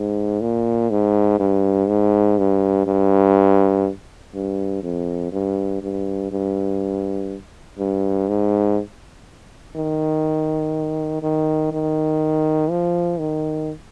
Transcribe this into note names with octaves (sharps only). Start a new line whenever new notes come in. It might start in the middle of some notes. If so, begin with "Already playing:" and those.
Already playing: G#2
A#2
G#2
G2
G#2
G2
G2
G2
F2
G2
G2
G2
G2
G#2
D#3
D#3
D#3
F3
D#3